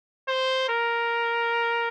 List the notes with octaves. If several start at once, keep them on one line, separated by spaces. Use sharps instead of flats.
C5
A#4